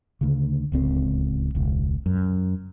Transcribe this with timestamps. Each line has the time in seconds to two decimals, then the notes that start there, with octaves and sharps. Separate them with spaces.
0.21 D2 C#3
0.72 D1 C#2 C4
1.55 E1 C#2
2.06 F#2